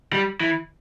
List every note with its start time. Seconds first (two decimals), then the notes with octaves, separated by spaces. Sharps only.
0.13 G3
0.41 E3